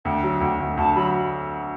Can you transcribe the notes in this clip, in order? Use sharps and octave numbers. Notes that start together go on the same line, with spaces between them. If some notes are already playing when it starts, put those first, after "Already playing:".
D2 G5
F#3
D2
D2
D2 A5
F#3 B5